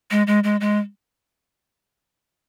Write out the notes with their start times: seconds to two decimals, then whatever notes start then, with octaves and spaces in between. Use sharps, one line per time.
0.11 G#3
0.27 G#3
0.44 G#3
0.61 G#3